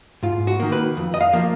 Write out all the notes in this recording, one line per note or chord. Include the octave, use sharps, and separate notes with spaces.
G#2 F4
F#4
D#3 A#3
B4
F2
D#5
F5
F3 A#3